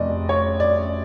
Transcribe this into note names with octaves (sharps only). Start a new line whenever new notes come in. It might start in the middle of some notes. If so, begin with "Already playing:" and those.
Already playing: F1 C3 D5 D#5
C#5
D5